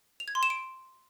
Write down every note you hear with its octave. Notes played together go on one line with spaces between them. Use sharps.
F7
G#6
C6
E7
D7